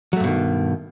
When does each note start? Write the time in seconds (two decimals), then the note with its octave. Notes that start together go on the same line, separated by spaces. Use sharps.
0.13 F#3
0.17 A3
0.20 G2
0.24 B2
0.27 D#3